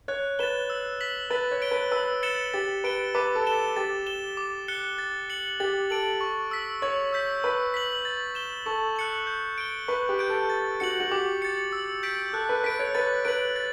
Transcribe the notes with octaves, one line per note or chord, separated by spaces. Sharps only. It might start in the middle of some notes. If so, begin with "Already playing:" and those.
C#5 F#6
B4 A6 E7 G7
E6
B6 F#7
B4 A6
C#5
D7 G7
B4
B4 E6
A6 C#7 E7 G7
G4 A6
B4 D7 G7
B4 D6
A4
A6 E7 G7
G4 A6
E7 G7
D6
F#6 C#7 G7
A6
C#7 F#7
G4 A6
A4 D7 F#7
C#6
E6 B6
C#5 C#6
E6 G6 B6
B4 E6
B6 F#7
A6
E7 G7
A4 C#6
F#6 C#7 F#7
G6
D7 G7
B4 C#6
G4
G6 D7
A4
A6
F#4 C#7 F#7
F#4
G4 D6
A6 C#7
E6
G6 B6 D7
A4 F#6
B4
B4 B6 D7
C#5
B4 A6
B4 D7 F#7
A6